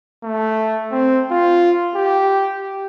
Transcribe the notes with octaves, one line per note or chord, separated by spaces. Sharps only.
A3
C4
F4
G4